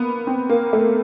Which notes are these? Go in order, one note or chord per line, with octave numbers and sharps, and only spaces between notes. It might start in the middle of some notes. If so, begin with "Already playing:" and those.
Already playing: A#3 B3
C4
A#3
A3